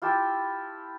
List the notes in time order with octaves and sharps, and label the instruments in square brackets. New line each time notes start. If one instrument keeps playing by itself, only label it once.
[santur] E4 F4 G4 A5